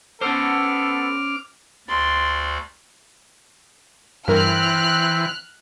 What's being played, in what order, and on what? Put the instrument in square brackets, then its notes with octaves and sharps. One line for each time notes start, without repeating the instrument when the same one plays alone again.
[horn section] B3 A4 [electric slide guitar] C#4 C5 [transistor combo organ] D6 F6
[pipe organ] D2 D5 [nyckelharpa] C6
[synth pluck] G2 A#4 [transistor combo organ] E3 [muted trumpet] C4 [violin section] F6 F#6